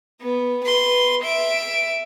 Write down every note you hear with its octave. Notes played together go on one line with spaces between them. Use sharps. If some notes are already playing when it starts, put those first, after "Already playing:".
B3
B4 C6
E5 D7